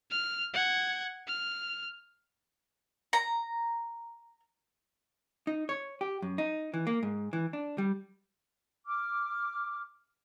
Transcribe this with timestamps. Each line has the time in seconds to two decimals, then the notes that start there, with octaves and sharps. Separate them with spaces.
0.11 F6
0.54 F#5 G#6
1.27 F6
3.13 A#5
5.47 D#4
5.69 C#5
6.01 G4
6.22 F#2
6.38 D#4
6.74 E3
6.87 A#3
7.03 G#2
7.33 E3
7.53 D4
7.78 G3
8.86 D6 F6